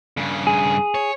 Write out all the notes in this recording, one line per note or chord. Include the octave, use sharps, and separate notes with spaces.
G2 C#3
G#4
C#5